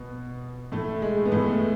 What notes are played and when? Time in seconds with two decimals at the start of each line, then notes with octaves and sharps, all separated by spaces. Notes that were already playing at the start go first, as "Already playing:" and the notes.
Already playing: B2 B3
0.72 A2 A3
1.02 G#3
1.25 B3
1.32 A2 A3